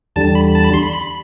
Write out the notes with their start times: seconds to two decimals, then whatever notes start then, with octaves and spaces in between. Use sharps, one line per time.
0.16 E2 D3 G3 A5
0.35 B5
0.55 A5
0.64 B5
0.74 C6
0.83 B5
0.93 B5